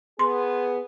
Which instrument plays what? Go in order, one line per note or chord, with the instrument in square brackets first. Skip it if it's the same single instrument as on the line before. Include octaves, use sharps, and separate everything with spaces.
[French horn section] B3 G#4 [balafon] C6